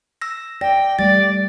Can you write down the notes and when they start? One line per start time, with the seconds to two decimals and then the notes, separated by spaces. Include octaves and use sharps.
0.22 E6 A#6
0.61 D5 G5 A#6
0.99 G3 A3 G4 D5 A6